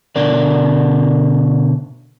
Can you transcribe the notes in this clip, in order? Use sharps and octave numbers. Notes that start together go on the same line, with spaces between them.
B2 D3 A#4 D5